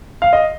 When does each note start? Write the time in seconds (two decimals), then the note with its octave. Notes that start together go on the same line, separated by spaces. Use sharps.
0.22 F5
0.33 D#5